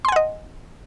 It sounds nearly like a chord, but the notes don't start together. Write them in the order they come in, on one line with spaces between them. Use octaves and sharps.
C6 G#5 F#5 D#5